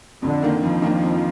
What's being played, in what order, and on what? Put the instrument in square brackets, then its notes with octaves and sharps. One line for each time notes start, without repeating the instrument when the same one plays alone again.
[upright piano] F2 [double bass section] D3
[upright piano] D#3 A#3 D4
[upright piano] F2 [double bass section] F3
[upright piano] D#3 A#3 D4
F2